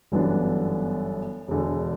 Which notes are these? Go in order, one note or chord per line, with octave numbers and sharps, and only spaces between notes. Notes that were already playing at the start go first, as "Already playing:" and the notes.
G1 F#2 E3 B3 D4
E1 E2 D3